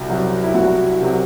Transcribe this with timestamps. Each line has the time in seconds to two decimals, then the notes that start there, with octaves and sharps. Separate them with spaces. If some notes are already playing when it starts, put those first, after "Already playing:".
Already playing: C2 F#4
0.08 C3 F#3
0.43 E4
0.54 C2 F#4
1.01 C3 F#3